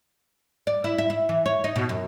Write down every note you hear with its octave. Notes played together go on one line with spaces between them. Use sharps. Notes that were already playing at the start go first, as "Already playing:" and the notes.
D5
E4
E5
E4
E3
C#5
D#4
B2
F#2